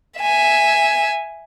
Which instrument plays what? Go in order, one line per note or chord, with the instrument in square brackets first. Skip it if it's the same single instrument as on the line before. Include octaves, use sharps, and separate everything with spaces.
[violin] E5 G#5